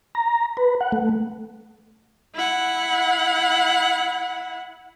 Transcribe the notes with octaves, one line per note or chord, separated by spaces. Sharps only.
A#5
B4
F#5
A3
E4 F#5